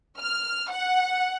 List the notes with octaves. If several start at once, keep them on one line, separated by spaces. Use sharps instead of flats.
F6
F#5